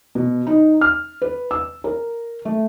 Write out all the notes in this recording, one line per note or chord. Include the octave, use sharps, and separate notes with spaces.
B2
D#4
F6
B4
E6
A#4
A3